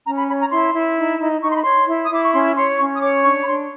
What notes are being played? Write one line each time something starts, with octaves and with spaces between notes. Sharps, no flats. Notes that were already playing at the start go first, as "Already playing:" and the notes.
C#4 A#5
B5
C#5 B5
A#5
E4 C6
E4
D#4
D#4
D#4 C#6
C6
B5
C#5 C6
E4
D#6
E4 D6
C#6
C#4 C6
C#5 C6
C#4 C#6
D#6
C#5 D6
D4 C#6
B5
D4 C6